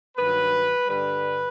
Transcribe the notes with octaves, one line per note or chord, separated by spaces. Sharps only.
G2 D#3 F#3 B4
G2 D3 G3 B4